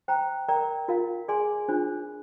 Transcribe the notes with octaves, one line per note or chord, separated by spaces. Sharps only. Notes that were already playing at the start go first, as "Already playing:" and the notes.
C5 G5 A#5
A#4 D5 G5 A#5
F4 A#4 F5
G#4 D5 G#5 C6
D4 F4 C5